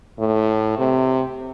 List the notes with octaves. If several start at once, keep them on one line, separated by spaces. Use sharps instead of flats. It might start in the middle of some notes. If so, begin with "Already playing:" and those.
A2
C3